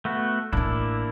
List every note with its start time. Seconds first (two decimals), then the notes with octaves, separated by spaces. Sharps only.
0.05 A3 B3 F#4
0.53 A1 A#3 C#4 D4 E4